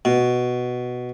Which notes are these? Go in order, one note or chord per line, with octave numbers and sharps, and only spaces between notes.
B2